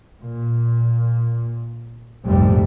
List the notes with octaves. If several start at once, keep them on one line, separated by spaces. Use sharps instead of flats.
A#2
F1 A#1 G#2 G3